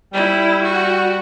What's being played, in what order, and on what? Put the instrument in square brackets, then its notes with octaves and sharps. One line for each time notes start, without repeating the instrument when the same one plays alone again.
[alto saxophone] G3 [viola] E4
[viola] F#4